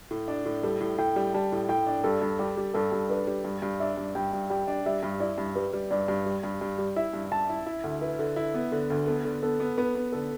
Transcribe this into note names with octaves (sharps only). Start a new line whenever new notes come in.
A2
D4
A2
G3 A4
A2
A2 G5
G3
G3 A5
A2
A2 G5
D4
G2 A4
G2
G3 G4
G3
G2 A4
G2
D4 B4
G3
G2
G2
D4 E5
G2
G2 G5
G2
G3 G5
D4
G3 E5
G2
E4 D5
G2
G3 B4
G3
G2 D5
G2
G3
G2
G2
G3
E4 E5
G2
G2 A5
E4
E4
D2
E4 B4
D3
E4
B3
D3
D2
B3 A4
D3
B3 A4
B3
B3 B4
B3
D3 A4